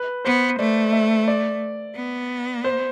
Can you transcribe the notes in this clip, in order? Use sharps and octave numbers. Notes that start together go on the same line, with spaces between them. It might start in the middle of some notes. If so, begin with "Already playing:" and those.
Already playing: B4
B3 C5
A3 D5
E5
D5
B3
C5